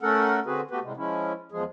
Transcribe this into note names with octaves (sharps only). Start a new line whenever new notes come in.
A3 C#4 A4 A#4 F#5
D3 C4 F#4 G#4 B4
A3 B3 F#4 G4 B4
A2 C3 G3 G#3
F3 G#3 C#4 E4
E2 F3 G#3 G#4